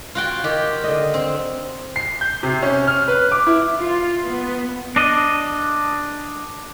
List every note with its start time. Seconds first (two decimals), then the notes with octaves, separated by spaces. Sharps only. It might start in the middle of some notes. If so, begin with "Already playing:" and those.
0.15 F4 F#4 G5
0.44 D#3 G4
0.84 D3 D#5
1.14 C4
1.96 C7
2.21 G6
2.43 C3
2.63 C#4
2.87 F6
3.08 B4
3.32 D6
3.47 E4
3.78 F4
4.25 B3
4.96 D4 D#5